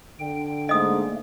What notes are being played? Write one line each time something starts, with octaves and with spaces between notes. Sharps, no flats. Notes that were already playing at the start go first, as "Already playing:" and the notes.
D3 G5
G#2 A3 A#3 D#5 D#6